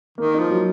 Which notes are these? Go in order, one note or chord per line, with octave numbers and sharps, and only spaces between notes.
D#3 A#3
F3 D#4
F#3